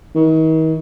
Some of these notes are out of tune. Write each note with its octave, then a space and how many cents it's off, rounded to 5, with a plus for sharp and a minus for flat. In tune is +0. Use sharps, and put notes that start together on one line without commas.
D#3 +40